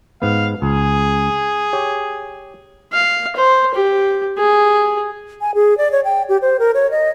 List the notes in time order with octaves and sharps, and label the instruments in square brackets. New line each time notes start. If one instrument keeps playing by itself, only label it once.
[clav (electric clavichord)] G#2 B3 [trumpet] F5
[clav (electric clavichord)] C#2 [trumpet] G#4
[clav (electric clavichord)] G4 C#5
[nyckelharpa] F5
C5
G4
G#4
[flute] G#5
G#4
D5
C#5
G5
G4
C5
A#4
C#5
D#5